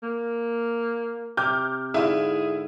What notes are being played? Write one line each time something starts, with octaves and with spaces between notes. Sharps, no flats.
A#3
C3 D6 F6 G6
G#2 D3 E4 F4 G#4